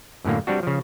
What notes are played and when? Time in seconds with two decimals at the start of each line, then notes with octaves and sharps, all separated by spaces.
0.25 F#2 A2 D3 A#3
0.47 G3 C4 D4 F#4
0.63 C#3 F3